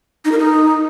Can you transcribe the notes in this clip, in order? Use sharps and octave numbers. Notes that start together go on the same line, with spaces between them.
D#4
A#4
D#4